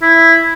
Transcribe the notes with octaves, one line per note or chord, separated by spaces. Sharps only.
E4